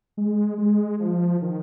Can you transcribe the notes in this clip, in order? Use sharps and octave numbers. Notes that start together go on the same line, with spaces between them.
G#3
G#3
F3
D#3